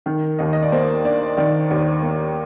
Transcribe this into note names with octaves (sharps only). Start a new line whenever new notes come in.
D#3 A#4
D#2 D#5
D#5
D5
A#3 C5
D4 D5
D#3 D5
D#2
A#3